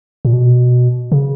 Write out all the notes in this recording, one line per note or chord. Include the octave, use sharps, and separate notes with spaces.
A#2
B2
C#3